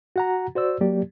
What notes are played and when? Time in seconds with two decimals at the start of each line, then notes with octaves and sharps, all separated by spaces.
0.16 F#4 F#5 A#5
0.55 F#4 C5 D5 E6
0.81 F#3 A#3 G4 D5